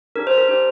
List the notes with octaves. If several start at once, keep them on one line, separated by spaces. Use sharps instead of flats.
D4 G4 A#4
C5
A#4
D4 G4 C5